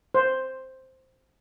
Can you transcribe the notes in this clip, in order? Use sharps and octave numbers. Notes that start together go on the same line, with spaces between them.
C5